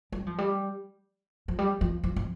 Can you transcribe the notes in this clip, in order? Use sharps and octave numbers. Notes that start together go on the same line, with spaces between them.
G3
F3
G3
F3
G3
F3
F3
F3